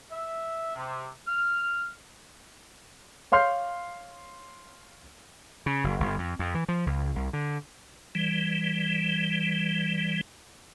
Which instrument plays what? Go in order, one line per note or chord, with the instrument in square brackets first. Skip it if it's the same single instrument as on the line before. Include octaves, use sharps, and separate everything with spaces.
[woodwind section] E5
C3
F6
[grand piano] C#5 F5 C6 F6 G6 C7
[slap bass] C#3
F#1
G1
F2
F2
E3
F3
C#2
C2
D3
[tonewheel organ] E3 G3